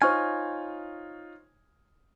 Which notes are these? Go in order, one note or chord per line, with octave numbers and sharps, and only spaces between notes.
D#4 F4 C5 C#5 G#5 C#6 F6